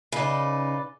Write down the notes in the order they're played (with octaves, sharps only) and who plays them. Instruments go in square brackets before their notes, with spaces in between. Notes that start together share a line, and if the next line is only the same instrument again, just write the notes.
[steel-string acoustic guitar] C#3 D#4 [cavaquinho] B4 D5